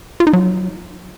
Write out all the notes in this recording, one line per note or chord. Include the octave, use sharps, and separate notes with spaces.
F4
D#4
F#3